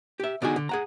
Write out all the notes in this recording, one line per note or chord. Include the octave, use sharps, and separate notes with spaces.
G4 E5
B2 D3 D4 D#4 F#4 G#4
D3
G#4 F#5 A#5